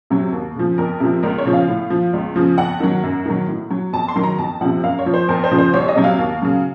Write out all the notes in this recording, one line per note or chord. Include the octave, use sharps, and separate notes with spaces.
C3 F#3
D#2
C#3 F3
F2 A#4
C3 F3
C#2 A#4
C#5
C#3 F3
F5
A2
F3
C#2
C#3 F3
F2 F#5
D#3 F#3
F#2
D#3 F#3
A2
F#3
F2 A5
C6
D#3 F#3
A#5
F2 A5
C3 F3 F#5
F#2 F5
C#5
F3
C5
F2 A#4
C5
C#3 F3
C5
C2 C#5
D#5
C3 F#3
F5
D#2
C#3 F#3